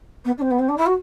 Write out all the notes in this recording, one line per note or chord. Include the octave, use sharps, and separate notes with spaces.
B3
D4
C4
B3
C4
D4
E4
F#4